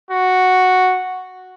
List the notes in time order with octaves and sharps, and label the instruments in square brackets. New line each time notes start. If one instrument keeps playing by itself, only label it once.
[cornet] F#4